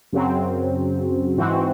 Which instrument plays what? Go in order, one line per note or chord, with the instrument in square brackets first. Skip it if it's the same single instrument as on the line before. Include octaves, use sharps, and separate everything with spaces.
[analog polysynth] F#2 C#3 F#3 C4
G#2 E3 C4 F#4